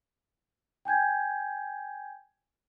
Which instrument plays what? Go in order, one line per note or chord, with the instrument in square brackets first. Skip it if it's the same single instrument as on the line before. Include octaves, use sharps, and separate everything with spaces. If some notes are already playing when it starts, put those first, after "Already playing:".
[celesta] G5 G#5 G6 G#6